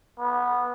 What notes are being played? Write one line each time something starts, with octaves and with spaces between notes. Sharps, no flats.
B3